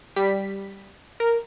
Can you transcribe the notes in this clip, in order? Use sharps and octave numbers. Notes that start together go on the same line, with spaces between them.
G3 B6
A#4